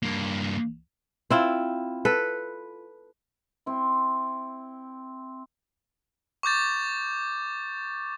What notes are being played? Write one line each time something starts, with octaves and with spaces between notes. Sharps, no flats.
G2 A#3
C4 E4 F4
A4 B4
C4 E4
C#6 D6 G6 A6